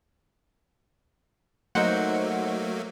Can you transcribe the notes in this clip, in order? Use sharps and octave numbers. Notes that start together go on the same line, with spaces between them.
F#3 A3 A#3 D#4 C5 F#5